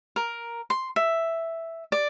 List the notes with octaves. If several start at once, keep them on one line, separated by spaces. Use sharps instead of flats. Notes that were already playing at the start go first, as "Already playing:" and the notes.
A#4
C6
E5
D5